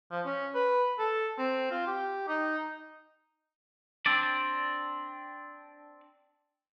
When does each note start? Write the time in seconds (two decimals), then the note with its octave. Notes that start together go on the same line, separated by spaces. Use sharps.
0.11 F3
0.26 C#4
0.54 B4
0.99 A4
1.38 C4
1.71 F4
1.87 G4
2.28 D#4
4.06 C4 D4 D5